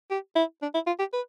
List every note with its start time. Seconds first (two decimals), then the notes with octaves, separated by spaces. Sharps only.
0.11 G4
0.36 E4
0.62 D4
0.75 E4
0.87 F4
0.99 G4
1.13 B4